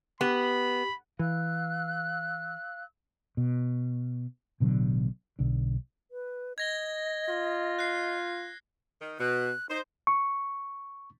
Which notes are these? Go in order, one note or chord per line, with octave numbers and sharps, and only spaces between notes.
B3 G4 B5
E3 F5 E6 F#6
B2
A1 B2 D3 F#3
B1 D3
B4
D#5 G#6 A#6 G7
F4
F#6 C7
D#3
B2 F#6
D#4 C5
C#6